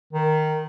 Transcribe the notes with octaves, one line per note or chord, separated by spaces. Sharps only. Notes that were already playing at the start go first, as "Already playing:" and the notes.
D#3